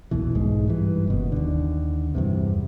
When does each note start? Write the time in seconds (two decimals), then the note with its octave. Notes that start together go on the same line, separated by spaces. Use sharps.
0.11 A#1 E2 B2 E3
0.35 B1 G#2 G#3
0.68 G2 E3
1.07 F#1 B2
1.32 D#2 D3
2.15 E2 G2 C3